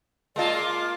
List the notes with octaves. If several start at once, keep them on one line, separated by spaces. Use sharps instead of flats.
G#3 A#3 F4 D5 D#5 A5
C6 D6 F6